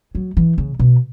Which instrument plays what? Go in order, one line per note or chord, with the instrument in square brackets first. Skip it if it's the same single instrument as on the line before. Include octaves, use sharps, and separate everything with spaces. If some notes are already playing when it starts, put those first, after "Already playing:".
[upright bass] F#3
E3
C#3
B2